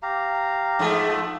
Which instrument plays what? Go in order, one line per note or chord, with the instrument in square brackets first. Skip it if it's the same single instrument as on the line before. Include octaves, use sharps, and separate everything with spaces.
[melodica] G4 F5 A#5
[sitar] G#2 F3 A3